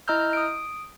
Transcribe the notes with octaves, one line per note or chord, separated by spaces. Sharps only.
E4 D#5 A#5 E6 F6 G6
D#6 D7